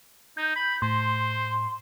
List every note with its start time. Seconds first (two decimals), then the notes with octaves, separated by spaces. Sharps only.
0.37 D#4 G6
0.56 B5
0.82 A2 C5 C6